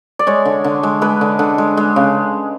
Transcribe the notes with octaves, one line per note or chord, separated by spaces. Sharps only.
D5
G#3 C#5
D3
D3
G#3
G#3 B4
D3
D3
G#3
G#3
C#3